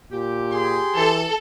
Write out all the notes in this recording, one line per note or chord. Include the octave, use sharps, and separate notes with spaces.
A#2 G4
G#4 C6
E3 A4